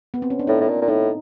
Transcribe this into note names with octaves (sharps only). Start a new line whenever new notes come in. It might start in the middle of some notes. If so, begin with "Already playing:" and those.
B3
C4
C#4
D4
A2 D#4
A2
A#2
A#2
A2 D#4